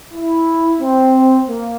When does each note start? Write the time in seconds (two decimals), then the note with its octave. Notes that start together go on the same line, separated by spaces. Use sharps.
0.14 E4
0.80 C4
1.48 A#3